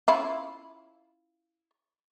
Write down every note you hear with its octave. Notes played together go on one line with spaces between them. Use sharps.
C#4 E4 F4